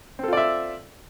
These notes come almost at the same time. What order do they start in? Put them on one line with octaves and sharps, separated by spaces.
C4 A4 F4 D5 E5